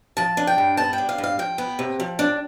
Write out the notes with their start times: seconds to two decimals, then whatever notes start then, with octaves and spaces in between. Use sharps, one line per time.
0.17 F3 A5
0.37 D4
0.47 G5
0.58 G2
0.77 B3 A5
0.93 G5
0.98 D4
1.09 F5
1.18 G2
1.24 F5
1.39 F3 G5
1.58 B3
1.79 C3
2.00 F3
2.19 D4